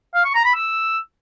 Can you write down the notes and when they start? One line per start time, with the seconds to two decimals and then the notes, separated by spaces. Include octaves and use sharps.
0.14 F5
0.25 C#6
0.35 A#5
0.45 B5
0.55 E6